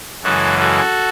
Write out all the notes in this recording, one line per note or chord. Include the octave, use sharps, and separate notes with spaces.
F#2 C#3 E3 G#3 F#4 A4
F#4 A4